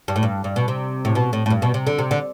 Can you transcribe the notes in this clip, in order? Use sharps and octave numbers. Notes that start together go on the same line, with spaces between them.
G2
A2
G2
G2
B2
C3
A2
B2
A2
A2
G2
B2
C3
D3
C3
D3